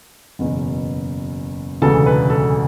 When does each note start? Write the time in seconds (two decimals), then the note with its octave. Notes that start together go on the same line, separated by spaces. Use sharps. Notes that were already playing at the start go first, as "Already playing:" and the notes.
0.39 F#1 E2 B2
1.82 E1 D2 C#3 E3 A4
2.06 B4
2.30 A4